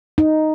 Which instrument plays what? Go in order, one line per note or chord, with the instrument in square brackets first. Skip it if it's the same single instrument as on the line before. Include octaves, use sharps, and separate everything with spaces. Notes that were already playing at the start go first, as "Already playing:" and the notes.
[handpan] D#4